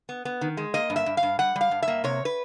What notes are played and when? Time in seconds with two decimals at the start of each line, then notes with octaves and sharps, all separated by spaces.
0.09 B3
0.25 B3
0.41 D#3
0.57 G#3
0.74 A#3 D#5
0.90 G2
0.96 E5
1.06 G2
1.17 F5
1.23 G2
1.39 G3 F#5
1.56 G3
1.61 F5
1.71 G2
1.82 E5
1.88 A#3
2.04 C3 C#5
2.25 B4